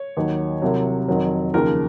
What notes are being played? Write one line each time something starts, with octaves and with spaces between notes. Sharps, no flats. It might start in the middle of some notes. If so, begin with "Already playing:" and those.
Already playing: C#5
D#2 D#3 F#3
C2 C3 F#3
F2 D#3 F#3
D#2 C#3 F3 A#4